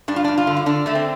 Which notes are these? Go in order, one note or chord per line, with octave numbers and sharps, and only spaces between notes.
G2 D4
F4
G2 D4
F4
D3
F4
D3 D4
D3 A3
C4